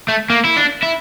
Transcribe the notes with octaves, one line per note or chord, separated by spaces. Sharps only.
A3
A#3
E4
D4
E4